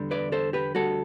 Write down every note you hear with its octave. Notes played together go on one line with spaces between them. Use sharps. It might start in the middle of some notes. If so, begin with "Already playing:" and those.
Already playing: E2 D3 G3
B4 D5
A4 C5
G4 B4
D2 D3 G3 F#4 A4